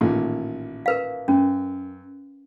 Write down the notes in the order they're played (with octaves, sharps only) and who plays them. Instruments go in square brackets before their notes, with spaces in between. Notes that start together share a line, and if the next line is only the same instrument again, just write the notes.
[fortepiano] A1 A#2 D#3
[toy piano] A#4 B4 F5
[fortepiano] F#2 [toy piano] C#4